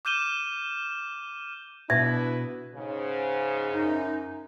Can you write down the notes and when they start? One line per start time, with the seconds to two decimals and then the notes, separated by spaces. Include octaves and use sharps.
0.05 D6 F6 G6 D#7 E7 G7
1.90 B2 D4 E4 B4 E5 G#6
2.74 G#2 C#3
3.72 F#2 D#4